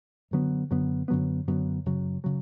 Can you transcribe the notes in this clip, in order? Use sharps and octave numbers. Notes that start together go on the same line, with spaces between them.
F#2 D3 F#3 B3
F#2 D3 F#3 B3
F#2 D3 F#3 B3
F#2 D3 F#3 B3
F#2 C#3 F#3
C#3 F#3